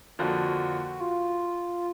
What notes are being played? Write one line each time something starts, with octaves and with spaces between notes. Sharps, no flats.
F2 D3 F3 A#3 F#4
F4